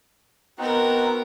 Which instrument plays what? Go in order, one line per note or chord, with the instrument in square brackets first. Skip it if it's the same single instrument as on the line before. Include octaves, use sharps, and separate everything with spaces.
[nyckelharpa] B3 A#4 [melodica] C4 D#4 F#4